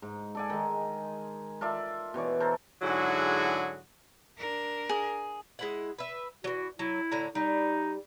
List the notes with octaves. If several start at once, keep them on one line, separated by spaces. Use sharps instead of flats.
G#2
A4 D5 G#5
D#3 G#3
F4 A4 D5 E5
B2 E3 C#5 D5
A4 A#4 C5 A5
G#2 D3 F#3 E4 F#4 G#4
D4 A#4
G#4
G#3 E4 F#5
B4 E5
E3 F#3 F#4
F#3 E4
A2 D3 A#5
G3 D#4